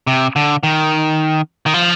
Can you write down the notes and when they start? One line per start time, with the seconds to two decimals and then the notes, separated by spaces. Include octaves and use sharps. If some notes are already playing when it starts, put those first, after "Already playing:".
0.07 C3
0.36 D3
0.63 D#3
1.66 D#3
1.74 F3